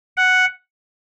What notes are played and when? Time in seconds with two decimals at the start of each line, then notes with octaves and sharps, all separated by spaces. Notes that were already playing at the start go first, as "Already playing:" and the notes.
0.17 F#5